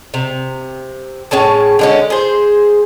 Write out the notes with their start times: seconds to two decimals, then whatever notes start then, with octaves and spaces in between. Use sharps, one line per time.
0.14 C3
1.31 A2 C#4 G#4 A5
1.79 D3 G#3 C#4
2.10 G#4 C5